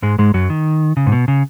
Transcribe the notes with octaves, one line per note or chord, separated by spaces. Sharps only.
G#2 G#3
G#2 G#3
F#2 F#3
D#3
C#3
G#2
B2
C#3